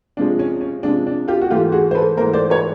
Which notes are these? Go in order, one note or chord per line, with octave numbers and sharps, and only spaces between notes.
C3 F3 G#3 D4
C#4
C#4
C3 F3 G#3 D4
D4
F4 G4
F#4
G#2 E3 A3 F4 G4
F#4 G#4
C5
A4 B4
G#2 E3 A3 A#4 C5
C5 D5
B4 C#5